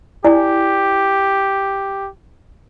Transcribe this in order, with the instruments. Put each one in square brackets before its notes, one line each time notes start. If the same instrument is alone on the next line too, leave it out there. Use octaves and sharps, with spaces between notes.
[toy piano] E4 D5 G#5 [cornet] G4